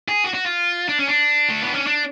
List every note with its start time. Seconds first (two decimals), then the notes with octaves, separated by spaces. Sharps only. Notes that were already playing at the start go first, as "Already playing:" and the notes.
0.08 G#4
0.24 F#4
0.34 F#4
0.46 F4
0.89 D4
0.99 C#4
1.07 D4
1.50 A3
1.62 B3
1.75 C#4
1.87 D4